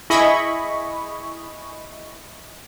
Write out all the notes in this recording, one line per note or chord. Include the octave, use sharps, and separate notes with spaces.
E4 G#4 D#5 B5 C#6